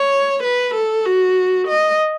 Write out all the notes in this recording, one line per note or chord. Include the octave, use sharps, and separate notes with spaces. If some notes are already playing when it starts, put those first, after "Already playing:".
Already playing: C#5
B4
A4
F#4
D#5